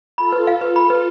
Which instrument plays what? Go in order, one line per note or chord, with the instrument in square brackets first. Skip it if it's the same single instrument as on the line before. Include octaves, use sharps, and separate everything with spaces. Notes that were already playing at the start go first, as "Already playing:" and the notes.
[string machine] F4 A4 [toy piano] B5
[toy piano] B4
F5
B4
B5
B4